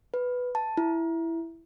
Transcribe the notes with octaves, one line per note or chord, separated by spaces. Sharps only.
B4
A5
E4